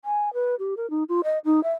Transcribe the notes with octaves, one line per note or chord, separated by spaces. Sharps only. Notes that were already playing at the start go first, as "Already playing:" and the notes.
G#5
B4
G4
A#4
D#4
F4
D#5
D#4
E5